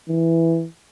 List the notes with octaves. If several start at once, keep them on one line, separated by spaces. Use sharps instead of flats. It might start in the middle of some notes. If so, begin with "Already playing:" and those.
E3